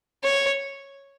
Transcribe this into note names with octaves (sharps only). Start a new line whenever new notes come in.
C#5